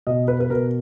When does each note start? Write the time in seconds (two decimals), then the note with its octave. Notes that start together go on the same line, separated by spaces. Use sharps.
0.07 B2 D#5
0.28 B4
0.40 B4
0.50 B2 A#4